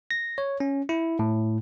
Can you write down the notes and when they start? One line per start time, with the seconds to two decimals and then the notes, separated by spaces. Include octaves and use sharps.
0.11 A#6
0.38 C#5
0.60 C#4
0.89 E4
1.19 A2